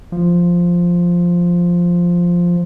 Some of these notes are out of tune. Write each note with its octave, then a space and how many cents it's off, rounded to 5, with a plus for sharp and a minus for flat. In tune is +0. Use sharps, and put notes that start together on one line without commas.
F3 +0